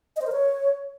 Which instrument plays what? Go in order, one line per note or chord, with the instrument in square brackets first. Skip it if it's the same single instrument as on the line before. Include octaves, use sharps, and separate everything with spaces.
[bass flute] D#5
C5
A#4
C#5